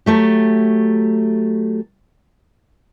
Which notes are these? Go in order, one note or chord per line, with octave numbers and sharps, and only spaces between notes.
F#3 A3 G4